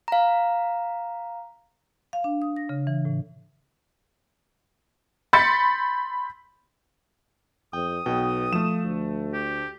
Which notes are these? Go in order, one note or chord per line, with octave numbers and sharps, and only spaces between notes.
F5 A#5
F5
D4
D#6
A#6
C#3
E3
A2
B5 C6 G6 A6 B6 C#7
F2 G5 D#6
B1 B2 G5
F3 A3 E7
D2
G4